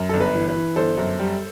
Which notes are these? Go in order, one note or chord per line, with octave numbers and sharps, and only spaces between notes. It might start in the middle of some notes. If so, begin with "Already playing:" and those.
Already playing: F#2
G1 A4
B4
E3
B4
E3
G1 A4 C5
F#2
G3